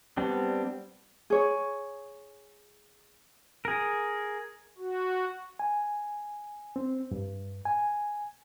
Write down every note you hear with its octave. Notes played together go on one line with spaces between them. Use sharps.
G3 B3 C4 D4
G#4 C#5
G#4 A#4
F#4
G#5
C4
G2
G#5